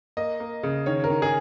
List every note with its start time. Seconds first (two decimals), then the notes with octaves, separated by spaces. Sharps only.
0.17 A#3 D#5
0.40 A#3
0.63 C#3
0.86 D#3 C#5
1.04 A#4
1.10 D#3
1.22 G#4